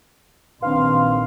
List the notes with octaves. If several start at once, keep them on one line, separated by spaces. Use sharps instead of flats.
A#1 D#3 C4 D4 B4 F5 C6